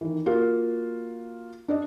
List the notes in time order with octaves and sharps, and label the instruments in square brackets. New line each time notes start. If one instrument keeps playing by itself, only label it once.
[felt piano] D#3 E3
A#3 F4 F#4 F5
D4 D5 D#5